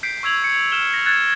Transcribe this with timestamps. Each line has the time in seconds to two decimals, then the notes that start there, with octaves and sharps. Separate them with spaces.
0.03 G6 B6 C7 D7
0.23 C#6 E6 G#6 F7 F#7
0.44 C#7
0.72 F6 E7 G7
0.94 A#6
1.06 F#6 G#6 A6